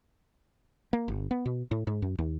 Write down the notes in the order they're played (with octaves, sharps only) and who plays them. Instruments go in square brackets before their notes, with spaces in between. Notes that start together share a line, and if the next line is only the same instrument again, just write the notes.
[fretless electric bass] A#3
G1
B3
B2
A2
G#2
F#2
D#2